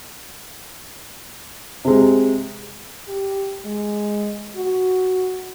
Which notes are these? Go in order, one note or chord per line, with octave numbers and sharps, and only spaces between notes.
C3 G#3
G4
G#3
F#4